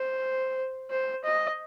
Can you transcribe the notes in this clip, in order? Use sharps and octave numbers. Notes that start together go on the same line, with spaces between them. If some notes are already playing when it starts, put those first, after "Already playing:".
Already playing: C5
C5
D#5